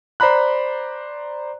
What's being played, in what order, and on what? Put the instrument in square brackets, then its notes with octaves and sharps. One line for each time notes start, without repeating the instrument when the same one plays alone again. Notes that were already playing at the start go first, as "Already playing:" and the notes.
[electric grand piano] C5 D5 A#5 B5 F#6